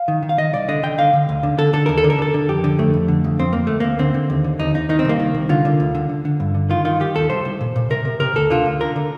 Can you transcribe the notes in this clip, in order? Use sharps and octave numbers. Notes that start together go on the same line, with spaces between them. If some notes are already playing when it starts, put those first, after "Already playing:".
Already playing: F5
D#3
D#3
F5
D#3 D#5
C2 D5
D3 D#5
D3 G5
D3 F5
D3
D2
D3
D3 A4
D3 A4
D#2 A#4
A4
D3
A#4
D3 A4
D3
F2 G4
D3
F2 A3
F2
D3
F2
F2 C4
F2 A#3
D2 A3
D2 A#3
D3 C4
D3
D#2
D3
D#2 D#4
D#2 D#4
D#3 D#4
C4
C2 A#3
D#3
C2
D3 F4
D3
D2
D3
D3
D3
G2
D3
D#3 F4
D#3 F4
D#3 G4
D#2 A4
C2 C5
C2
A#2
A#2
C3 A#4
C3
C3 A#4
D2 A4
D3 F4
D2
D3 A#4
D3